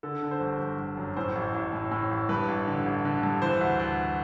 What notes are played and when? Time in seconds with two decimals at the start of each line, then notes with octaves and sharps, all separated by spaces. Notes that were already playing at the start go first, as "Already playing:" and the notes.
0.03 D3 A4
0.22 D3
0.31 C5
0.41 G1
0.60 G1
0.79 G1
0.97 F#2
1.17 A2 C5
1.35 A1
1.54 A1
1.73 A2
1.91 A2
2.11 A1
2.29 G2 B4
2.48 A1
2.67 D3
2.86 A1
3.05 D3
3.23 G2
3.42 E3 C5
3.61 D2
3.80 D2